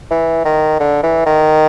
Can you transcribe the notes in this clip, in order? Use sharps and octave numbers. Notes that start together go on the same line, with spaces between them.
E3
D#3
D3
E3
D#3